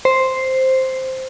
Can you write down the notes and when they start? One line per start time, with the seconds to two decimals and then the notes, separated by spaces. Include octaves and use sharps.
0.05 C5